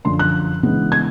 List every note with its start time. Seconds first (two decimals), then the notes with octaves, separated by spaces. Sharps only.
0.05 F#2 D3 F3 C6
0.19 F#6
0.63 C#3 E3 G#3 B3 D4
0.92 G#6